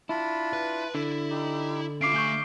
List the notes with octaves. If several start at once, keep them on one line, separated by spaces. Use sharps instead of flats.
D4 E4 F4 B5
B4
D3 E4
D#4 G4
C#4 F4 E5 F5 D6 C7 D7
A3 G#5 C#6 G6 G7